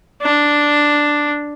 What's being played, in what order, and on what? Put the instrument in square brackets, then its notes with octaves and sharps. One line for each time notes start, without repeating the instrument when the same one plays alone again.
[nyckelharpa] D4